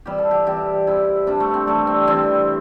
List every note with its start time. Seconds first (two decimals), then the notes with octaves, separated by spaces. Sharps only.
0.06 C3 E3 G3 G4
0.18 A4
0.31 G4
0.46 C3 E3 G3 G4
0.87 C3 G3 E4
1.27 C3 G3 D4
1.40 A3
1.54 C4
1.67 C3 E3 G3 A3
1.87 C4
2.07 C3 E3 G3 C4